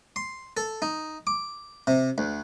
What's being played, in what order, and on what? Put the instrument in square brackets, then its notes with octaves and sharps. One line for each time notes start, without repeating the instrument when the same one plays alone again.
[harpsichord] C6
A4
D#4
D6
C3
D2